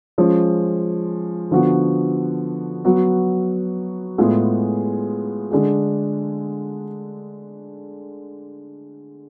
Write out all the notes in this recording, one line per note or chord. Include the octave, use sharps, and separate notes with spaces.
F3 G#3 C#4 F4
D3 F3 B3 F#4
F#3 B3 F#4
A2 G#3 B3 F4 G#4
D3 G#3 D4 G#4